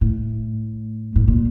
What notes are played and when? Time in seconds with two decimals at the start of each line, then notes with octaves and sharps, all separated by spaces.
0.01 A2
1.16 A2
1.28 A#2